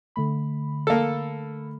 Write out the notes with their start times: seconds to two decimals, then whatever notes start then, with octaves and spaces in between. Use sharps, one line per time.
0.16 D3 A3 B5
0.87 A#3 A4